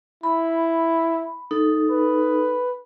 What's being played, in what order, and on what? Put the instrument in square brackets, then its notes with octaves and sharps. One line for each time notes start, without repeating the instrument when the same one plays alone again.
[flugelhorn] E4 [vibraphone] B5
[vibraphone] D#4 A4
[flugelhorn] B4